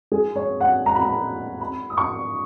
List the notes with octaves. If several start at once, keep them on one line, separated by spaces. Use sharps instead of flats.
G#4
C#5
F#5
A#5
B5
A#5
B5
D#6
C#6